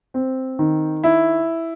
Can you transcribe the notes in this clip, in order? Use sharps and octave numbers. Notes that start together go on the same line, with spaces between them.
C4
D#3
E4